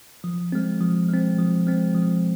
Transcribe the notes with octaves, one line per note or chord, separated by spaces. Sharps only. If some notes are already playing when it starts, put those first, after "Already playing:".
F3
G#3 C4
F3
G#3 C4
F3
G#3 C4
F3